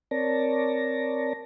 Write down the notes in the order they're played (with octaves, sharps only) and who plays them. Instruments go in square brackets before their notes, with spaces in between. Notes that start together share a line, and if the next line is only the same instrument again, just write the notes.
[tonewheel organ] C4 A#4 C#5 D5 A5 A#6